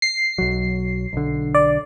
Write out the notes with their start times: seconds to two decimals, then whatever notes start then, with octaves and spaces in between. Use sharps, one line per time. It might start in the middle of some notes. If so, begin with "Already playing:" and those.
0.02 C7
0.38 B1 F#3
1.13 B1 D3
1.55 D5